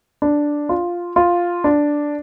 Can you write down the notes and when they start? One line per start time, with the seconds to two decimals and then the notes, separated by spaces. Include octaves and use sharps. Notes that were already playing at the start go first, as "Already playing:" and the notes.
0.22 D4
0.69 F4
1.16 F4
1.64 D4